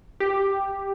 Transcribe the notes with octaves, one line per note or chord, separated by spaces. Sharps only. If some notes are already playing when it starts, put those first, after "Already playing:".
G4